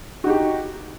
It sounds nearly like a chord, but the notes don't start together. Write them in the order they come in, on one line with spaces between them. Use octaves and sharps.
F#4 D#4 G4